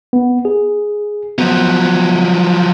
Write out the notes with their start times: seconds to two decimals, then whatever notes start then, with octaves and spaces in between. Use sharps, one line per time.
0.13 B3
0.45 G#4
1.38 F3 F#3 B3